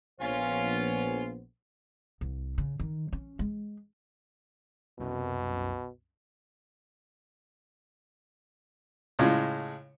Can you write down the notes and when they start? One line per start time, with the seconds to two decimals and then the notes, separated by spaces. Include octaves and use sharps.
0.20 A#1 B3 C#4 F4 C5
2.21 C2
2.58 C#3
2.80 D#3
3.13 C#4
3.39 G#3
4.99 C2 F#2 B2
9.19 A2 C#3 G#3 F4